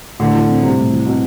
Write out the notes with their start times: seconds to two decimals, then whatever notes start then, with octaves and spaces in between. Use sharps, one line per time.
0.19 A2 D3
0.34 E3
0.48 C4
0.63 C3 G3
0.78 A2
0.92 E3
1.06 B2 C4